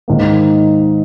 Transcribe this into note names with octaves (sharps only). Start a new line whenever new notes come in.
G#2 D#3 A#3